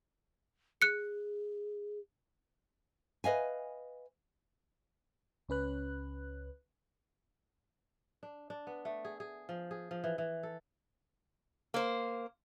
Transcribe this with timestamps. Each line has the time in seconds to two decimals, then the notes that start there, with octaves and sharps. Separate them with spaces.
0.82 G#4 F#6 C#7
3.24 B4 D#5 F5 G#5
5.49 C#2 C#4 B4 F#6
8.23 D4
8.50 D4
8.67 B3
8.85 A3
9.05 G#4
9.20 G#4
9.49 F3
9.71 G#4
9.91 F3
10.04 E3
10.18 E3
10.43 A4
11.74 A#3 C5